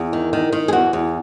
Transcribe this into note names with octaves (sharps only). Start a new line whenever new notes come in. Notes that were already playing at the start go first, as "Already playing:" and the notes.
Already playing: E2
D#3
D#3
D#3
G#4
E2 F#4
E2